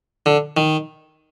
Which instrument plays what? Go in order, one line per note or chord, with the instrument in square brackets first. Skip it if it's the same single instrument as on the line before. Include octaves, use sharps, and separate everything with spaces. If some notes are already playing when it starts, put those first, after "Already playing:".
[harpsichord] D3
D#3